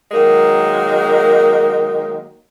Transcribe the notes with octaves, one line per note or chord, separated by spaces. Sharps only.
D#3 F#3 G#3 A#3